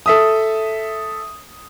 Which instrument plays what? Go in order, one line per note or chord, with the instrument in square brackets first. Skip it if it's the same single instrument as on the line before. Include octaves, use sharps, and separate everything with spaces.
[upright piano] A4 E5 D#6